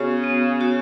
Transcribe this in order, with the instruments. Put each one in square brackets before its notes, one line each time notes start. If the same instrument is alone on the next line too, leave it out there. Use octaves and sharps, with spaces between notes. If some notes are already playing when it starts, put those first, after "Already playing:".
Already playing: [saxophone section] C#3 [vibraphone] B3 F#4 C#5
[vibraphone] B3
F#4 C#5